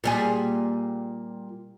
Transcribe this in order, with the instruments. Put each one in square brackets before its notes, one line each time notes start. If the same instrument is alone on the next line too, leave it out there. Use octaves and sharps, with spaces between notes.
[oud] A#2 G3 G#4